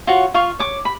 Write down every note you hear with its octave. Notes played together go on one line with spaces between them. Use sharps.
F4 F#4 C#5
F4 F5 C#6
C#5 D6
B5